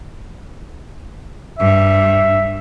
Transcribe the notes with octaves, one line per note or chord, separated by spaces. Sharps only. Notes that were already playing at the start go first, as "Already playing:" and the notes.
G2 E5